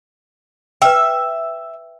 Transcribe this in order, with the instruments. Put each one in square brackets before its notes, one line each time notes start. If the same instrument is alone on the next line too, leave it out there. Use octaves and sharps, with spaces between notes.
[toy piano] B4 G5 [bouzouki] E5